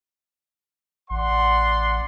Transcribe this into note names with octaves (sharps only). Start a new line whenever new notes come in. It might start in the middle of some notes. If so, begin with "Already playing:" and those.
A1 D5 F#5 C6